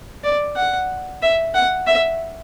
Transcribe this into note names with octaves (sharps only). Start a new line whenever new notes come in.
D5
F#5
E5
F#5
E5